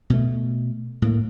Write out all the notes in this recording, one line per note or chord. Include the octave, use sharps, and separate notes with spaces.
B2 A3
A2 A#3